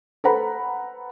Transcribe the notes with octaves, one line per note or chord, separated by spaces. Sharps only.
A4 B4 C5 F#5 A#5 B5